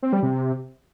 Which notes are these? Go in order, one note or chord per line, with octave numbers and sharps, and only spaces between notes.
C4
G3
C3